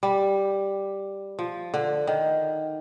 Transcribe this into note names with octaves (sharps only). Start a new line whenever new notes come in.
G3
F3
D3
D#3